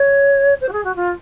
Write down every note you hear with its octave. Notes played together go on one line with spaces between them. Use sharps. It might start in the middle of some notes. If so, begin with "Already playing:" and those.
Already playing: C#5
C5
F#4
G#4
F#4
F4